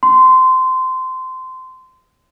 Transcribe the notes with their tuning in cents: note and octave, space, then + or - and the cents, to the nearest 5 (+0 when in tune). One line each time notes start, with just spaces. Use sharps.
C6 -20